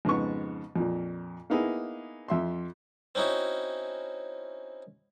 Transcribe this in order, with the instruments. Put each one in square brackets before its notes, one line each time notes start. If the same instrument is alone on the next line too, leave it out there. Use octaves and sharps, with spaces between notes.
[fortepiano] F2 G#2 C#3 B3 C#6
F2 A#2
A#3 B3 D#4 E4 G#4
F2 E5 C6
[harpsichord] C4 C#4 D#4 E4 F#4